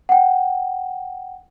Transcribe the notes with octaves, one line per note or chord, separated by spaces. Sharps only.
F#5 G5